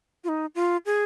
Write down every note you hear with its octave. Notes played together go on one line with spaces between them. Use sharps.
F4
D#4
F4
G#4